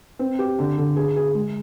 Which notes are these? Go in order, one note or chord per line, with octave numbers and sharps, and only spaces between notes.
C4
G4
D3
D3
G#4
G#4
G#3